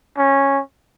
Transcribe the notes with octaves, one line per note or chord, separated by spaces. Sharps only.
C#4